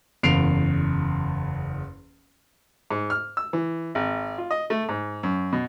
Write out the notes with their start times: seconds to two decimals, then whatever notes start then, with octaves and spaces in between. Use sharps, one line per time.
0.23 F#1 E2 C7 D7 F7
2.91 G#2
3.10 F6
3.37 E6
3.53 E3
3.95 G#1
4.38 F4
4.51 D#5
4.70 A3
4.89 G#2
5.23 F#2
5.53 B2